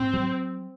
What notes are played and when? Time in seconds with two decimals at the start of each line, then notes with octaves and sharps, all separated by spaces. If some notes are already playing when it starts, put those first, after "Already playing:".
Already playing: G#2 C4
0.14 F#3